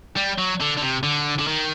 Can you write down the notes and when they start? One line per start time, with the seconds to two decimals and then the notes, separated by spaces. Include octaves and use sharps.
0.16 G3
0.38 F#3
0.60 D3
0.77 D3
0.82 C3
1.03 D3
1.39 D3
1.47 D#3